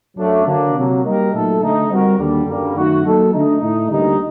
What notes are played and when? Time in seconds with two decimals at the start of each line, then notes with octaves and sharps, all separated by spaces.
0.17 F#2 F#3 A3 D4
0.46 D3 F#3 A#3 D4
0.74 C3 F#3 A#3
1.04 G3 A#3 D#4 G4 A#4
1.31 A#2 F#3 A3 D#4 A4
1.61 D3 A3 D#4
1.90 G3 C4 F#4 A#4
2.18 D#2 D3 G3
2.46 F#2 D3 G3 A#3
2.75 F#2 D#3 A3 D#4 F#4
3.04 F#3 A#3 D#4 F#4 A4
3.32 D3 A3 D#4
3.61 A2 A3 D#4
3.90 D2 D3 G3 A#3 D#4